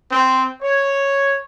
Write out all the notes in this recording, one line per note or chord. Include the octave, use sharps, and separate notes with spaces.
C4
C#5